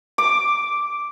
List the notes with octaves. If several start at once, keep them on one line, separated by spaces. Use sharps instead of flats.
D6